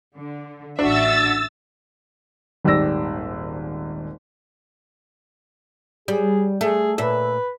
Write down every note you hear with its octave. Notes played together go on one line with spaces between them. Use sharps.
D3
A1 D4 F#4 E5 E6 A6
D#1 G#1 G4 D5 E6 A#6
G3 G#4
A3 G#4
A#2 B4 E5